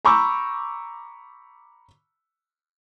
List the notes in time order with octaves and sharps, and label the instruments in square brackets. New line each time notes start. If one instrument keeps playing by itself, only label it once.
[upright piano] A#5 B5 C#6 D6 E6 G6